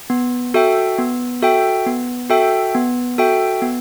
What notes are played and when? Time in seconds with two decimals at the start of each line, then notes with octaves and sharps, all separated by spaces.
0.10 B3
0.54 F#4 A4 E5 G5
0.98 B3
1.42 F#4 A4 E5 G5
1.86 B3
2.30 F#4 A4 E5 G5
2.75 B3
3.18 F#4 A4 E5 G5
3.62 B3